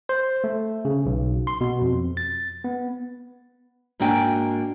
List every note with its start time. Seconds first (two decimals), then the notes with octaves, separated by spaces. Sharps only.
0.09 C5
0.44 A3
0.85 C#3
1.06 B1
1.47 C6
1.61 B2
1.82 F2
2.17 A6
2.64 B3
4.00 G#2 A#3 D4 F#4 G5 G#5